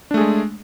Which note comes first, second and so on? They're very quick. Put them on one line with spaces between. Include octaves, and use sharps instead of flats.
D4 A3 G#4 G#3